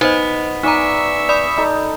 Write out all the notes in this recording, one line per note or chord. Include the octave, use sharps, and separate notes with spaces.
B3 D#4 C5 D#5
D#4 G#4 D5 E5 A#5 C#6 E6
D5 B5 D#6
D#4 A4 A5